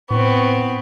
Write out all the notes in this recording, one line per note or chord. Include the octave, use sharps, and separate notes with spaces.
A2 B3 C4 C#6